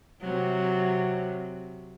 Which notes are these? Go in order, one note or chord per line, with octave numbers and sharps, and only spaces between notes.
C3 F#3